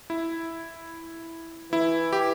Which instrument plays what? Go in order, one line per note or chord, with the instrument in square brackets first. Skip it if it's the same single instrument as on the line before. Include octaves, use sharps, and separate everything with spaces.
[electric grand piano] E4
[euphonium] E3 [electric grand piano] E4
[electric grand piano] G4